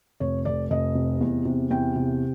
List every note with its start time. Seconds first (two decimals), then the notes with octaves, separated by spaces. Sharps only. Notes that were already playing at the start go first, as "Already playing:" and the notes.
0.20 F1 C#5
0.45 F1 D5
0.70 F1 D#5
0.95 C3
1.21 E2
1.45 C3
1.70 E2 G5
1.96 C3